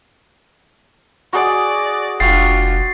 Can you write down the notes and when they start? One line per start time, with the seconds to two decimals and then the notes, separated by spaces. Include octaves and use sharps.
1.33 F#4 G#4 D5 D#5
2.20 F1 D4 F4 F#4 G5 A6 C7